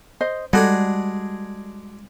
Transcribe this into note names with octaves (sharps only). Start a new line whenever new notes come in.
C5 D#5
G3 G#3 D4 F#4 G#4 A4